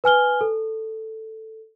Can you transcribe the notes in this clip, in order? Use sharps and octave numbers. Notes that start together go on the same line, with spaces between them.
B4 G#5 F6 G7
A4